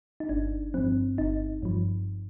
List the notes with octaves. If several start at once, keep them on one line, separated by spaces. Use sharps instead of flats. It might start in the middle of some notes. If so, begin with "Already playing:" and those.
D#4
G1 D4
G2 F3 C4
G1 D#4
G2 F3